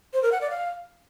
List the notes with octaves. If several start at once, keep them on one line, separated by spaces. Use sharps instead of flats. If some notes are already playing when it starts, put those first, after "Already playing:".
C5
A#4
F#5
D5
F5